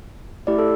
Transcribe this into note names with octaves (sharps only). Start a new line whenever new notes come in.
A3 E4 G4 D5
A4